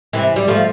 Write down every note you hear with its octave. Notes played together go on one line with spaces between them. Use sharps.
C3 E3
G3
F3 A3